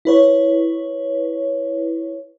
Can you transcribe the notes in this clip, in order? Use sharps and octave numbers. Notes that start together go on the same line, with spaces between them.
E4 B4 C#5